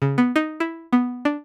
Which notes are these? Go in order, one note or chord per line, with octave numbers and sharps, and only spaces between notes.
C#3
B3
D#4
E4
B3
D4